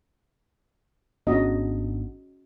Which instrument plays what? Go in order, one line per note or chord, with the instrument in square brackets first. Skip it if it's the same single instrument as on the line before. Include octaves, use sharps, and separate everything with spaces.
[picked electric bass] G#1 B3 D4 [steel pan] C#4 F#4 D#5